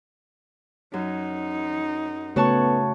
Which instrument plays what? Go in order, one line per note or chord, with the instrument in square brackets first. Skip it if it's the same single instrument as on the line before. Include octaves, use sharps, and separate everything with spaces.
[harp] F#2 [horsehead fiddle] D#4
[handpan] C#3 A3 C#5 [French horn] B3 [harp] F#4 A5 C#6